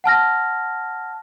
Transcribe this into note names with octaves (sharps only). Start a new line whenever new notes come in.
F#5 A5 F6 A#6